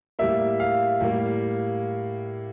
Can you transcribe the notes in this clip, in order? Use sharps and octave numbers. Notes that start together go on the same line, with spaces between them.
A2 G3 A#3 E5
F5
A2 G3 A#3